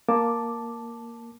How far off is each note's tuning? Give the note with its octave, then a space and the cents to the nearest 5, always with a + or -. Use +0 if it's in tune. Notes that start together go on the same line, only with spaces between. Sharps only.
A#3 +0 A5 +0 D6 +0